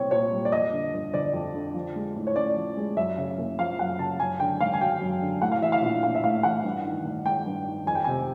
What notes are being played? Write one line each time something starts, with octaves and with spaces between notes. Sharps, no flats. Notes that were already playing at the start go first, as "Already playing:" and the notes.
Already playing: C2 A#2 C4 C#5
A#2 C#5
G3
D5
F2 D#5
D3
G1
G1 D5
F2
D3
F3
G#3
A2
C#5
C#4 D5
F3
G#3
F#2 E5
C#3
F#1
F3 F5
F#2 F#5
C#3 A5
F#2 G#5
D3 G5
G#1 F5
G#5
F#3 G5
F#2
D3
A2 F#5
F5
E3 E5
F5
A#1
A#1 F5
E5
A2 F5
E3 F#5
G2
D#3
A1
G#3 G5
G2
D#3
F2 G#5
G5
C3 G#5